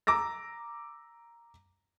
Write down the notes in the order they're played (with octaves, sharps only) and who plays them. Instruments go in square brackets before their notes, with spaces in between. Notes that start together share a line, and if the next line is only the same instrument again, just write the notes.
[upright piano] A#5 D6 E6 A#6